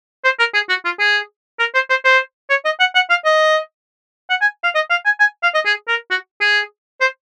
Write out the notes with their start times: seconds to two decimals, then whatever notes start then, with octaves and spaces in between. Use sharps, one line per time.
0.24 C5
0.39 A#4
0.54 G#4
0.69 F#4
0.85 F4
0.99 G#4
1.59 A#4
1.74 C5
1.90 C5
2.05 C5
2.50 C#5
2.65 D#5
2.80 F#5
2.95 F#5
3.10 F5
3.25 D#5
4.30 F#5
4.41 G#5
4.64 F5
4.75 D#5
4.90 F5
5.05 G#5
5.20 G#5
5.43 F5
5.54 D#5
5.65 G#4
5.88 A#4
6.11 F#4
6.41 G#4
7.01 C5